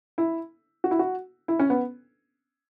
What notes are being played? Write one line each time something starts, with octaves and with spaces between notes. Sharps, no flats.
E4
F#4
E4
F#4
E4
C#4
B3